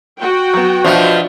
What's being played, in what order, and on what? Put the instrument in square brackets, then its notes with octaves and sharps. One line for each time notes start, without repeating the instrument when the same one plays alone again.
[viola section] F#4 G5
[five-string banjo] F#3 B3
[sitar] B2 F3 [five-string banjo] D4 E5